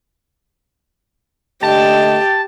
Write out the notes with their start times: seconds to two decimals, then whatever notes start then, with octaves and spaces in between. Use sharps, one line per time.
1.63 D3 A3 G4 D#5 A5